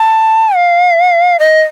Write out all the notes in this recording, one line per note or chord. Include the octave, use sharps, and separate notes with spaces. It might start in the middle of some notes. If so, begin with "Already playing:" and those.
Already playing: A5
F5
D#5